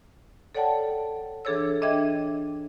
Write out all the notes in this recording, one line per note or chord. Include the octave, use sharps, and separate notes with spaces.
A4 C#5 D5 F#5 G5 A5
E3 D4 G#4 A4 C#5 E6
D4 D#5 E5 G5 G#6